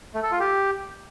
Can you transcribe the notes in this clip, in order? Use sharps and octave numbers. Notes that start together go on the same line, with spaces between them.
A3
A4
F4
G4